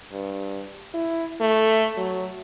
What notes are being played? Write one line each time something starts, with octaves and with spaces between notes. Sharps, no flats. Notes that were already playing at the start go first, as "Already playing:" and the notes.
G2
E4
A3
F#3